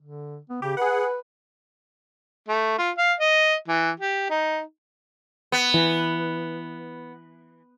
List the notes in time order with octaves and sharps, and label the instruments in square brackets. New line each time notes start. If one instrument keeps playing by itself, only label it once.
[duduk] D3
B3
[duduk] C#3 [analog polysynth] G4
[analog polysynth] G#4 F#5 [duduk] B4
[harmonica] A3
F4
F5
D#5
E3
G4
D#4
[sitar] B3
[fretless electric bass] E3